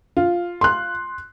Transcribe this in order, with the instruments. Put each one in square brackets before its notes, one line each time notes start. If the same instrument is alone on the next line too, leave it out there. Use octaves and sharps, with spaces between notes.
[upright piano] F4
[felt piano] C6 F#6